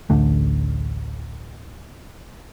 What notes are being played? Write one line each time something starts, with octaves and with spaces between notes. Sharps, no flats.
A1 D2 D3 A3